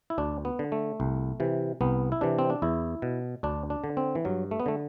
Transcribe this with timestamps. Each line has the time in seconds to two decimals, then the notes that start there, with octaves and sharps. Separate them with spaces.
0.10 E4
0.18 D2 D4
0.45 B3
0.59 D3
0.72 A3
1.00 C2
1.40 C3 E3
1.81 C2 B3
2.12 E4
2.21 C3 E3 D4
2.39 C4
2.50 D4
2.62 E2 E4
3.02 B2
3.43 D2 D4
3.70 D4
3.84 D3
3.97 C4
4.15 E3
4.25 G2 F#3
4.51 A3
4.60 B3
4.66 D3 A3